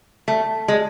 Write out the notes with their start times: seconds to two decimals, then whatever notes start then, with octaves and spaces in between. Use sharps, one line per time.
0.28 A3
0.68 G#3